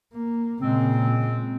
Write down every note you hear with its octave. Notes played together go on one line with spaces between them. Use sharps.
A#3
A#2 C#3 G#3 C4